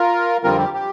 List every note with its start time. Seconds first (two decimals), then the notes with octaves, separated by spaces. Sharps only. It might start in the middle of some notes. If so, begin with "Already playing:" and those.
Already playing: F4 A#4
0.43 F2 D3 G3 C4 F4 A#4
0.59 G4
0.74 G4